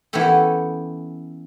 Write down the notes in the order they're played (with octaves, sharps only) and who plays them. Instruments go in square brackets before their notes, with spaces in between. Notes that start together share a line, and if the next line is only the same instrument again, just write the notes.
[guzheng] E3 B3 C#4 F#4 G4 A4